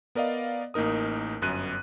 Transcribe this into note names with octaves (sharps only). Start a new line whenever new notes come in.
B3 A#4 D5 D#5 F5
A1 A#3 D#4 A#4 D#6
G1 F#2 F#6 D#7